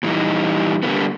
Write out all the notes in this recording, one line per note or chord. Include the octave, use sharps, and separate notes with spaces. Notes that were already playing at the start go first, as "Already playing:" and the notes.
A#2 E3 G3 D#4
D3 G3 A#3 B3